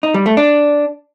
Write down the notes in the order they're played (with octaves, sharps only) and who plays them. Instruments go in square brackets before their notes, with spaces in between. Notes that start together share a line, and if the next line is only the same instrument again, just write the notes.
[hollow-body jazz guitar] D#4
G3
A3
D4